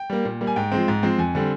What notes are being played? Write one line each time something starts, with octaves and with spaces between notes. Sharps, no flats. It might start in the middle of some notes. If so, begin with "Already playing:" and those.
Already playing: G5
G3 A#3
A#2
G3 A#3
G#5
G#2 G5
F3 G#3 C4
G#2
F3 G#3 C4
F2 G#5
D3 G3 C4